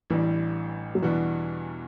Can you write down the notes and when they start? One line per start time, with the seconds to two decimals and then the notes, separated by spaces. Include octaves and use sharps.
0.10 A1 A2 E3 G3 D4
0.95 F#3
1.02 E2 B2 E3 G3 D4 F#4